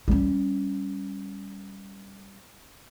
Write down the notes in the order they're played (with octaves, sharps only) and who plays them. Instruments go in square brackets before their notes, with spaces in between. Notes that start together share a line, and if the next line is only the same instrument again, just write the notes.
[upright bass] G3 C#4